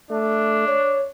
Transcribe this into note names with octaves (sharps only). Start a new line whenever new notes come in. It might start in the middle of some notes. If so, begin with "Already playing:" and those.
A3 D4
C#5